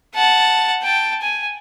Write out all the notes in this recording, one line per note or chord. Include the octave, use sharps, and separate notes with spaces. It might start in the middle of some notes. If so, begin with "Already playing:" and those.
F#5 A5
G5 A5
G#5